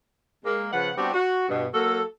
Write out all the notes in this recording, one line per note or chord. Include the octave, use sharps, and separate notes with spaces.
G#3 A#3
C#3 F3 B4 F#5
G3 B3 C4 D4 F#4 G4
F#4
G2 B2
F#3 A#3 F#4 A4